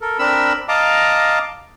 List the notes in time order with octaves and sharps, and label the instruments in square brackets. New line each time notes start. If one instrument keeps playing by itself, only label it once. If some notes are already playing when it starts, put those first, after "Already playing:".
[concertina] A4 A#4
C4 D4 A#4 B5 E6
D#5 F5 A5 A#5 D6